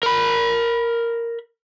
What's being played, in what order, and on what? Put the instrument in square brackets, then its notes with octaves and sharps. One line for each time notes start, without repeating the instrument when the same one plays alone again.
[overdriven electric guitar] A#4 B5